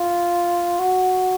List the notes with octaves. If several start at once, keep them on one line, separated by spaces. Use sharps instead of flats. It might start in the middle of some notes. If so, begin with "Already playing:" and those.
Already playing: F4
F#4